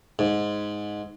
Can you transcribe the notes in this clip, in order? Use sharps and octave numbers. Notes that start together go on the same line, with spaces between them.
G#2